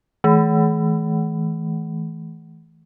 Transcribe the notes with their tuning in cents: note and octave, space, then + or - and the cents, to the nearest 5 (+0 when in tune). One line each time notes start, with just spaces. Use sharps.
E3 -20 A3 -20